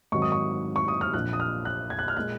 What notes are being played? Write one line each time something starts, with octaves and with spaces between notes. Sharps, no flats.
G#2 D#3 F#3 C4 C#6
D#6
C#6
C#6
D#6
F6
A#1 A#2 F3 F#6
D#6
F6
F#6
G#6
F#6
F6
A#2 G#3 F#6